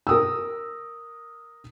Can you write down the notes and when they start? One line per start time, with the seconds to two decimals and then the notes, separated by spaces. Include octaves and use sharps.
0.07 A#4 D#6 E6